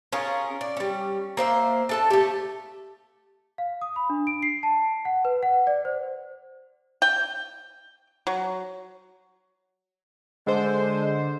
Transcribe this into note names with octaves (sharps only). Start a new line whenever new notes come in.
C#4 F4 G#4 A#4
D5
G3 C#4
A#3 C5 D5 E5
D4 A4 A5
A3 G4
F5
D#6
B5
D4
D7
C7
A5
F#5
B4
F#5
D5
C5
G5
F#3
D3 G#3 C5